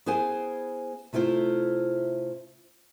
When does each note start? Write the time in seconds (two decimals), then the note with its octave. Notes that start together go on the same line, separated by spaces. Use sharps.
0.06 B3 E4 G#4 C5 F5 G#5
1.13 C3 A3 E4 F4 C5